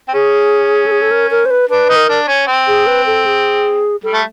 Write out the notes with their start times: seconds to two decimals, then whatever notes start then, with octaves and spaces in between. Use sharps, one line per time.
0.08 C4
0.14 C#4 G#4
0.86 A4
0.91 G#4
1.02 A4
1.11 A#4
1.31 A#4
1.45 C5
1.51 B4
1.69 D4 B4
1.89 D#4
1.96 A#4
2.09 D4
2.28 C#4
2.47 C4
2.67 G#4
2.87 B4
3.06 A4
3.26 G#4
4.03 G3 A4
4.13 A3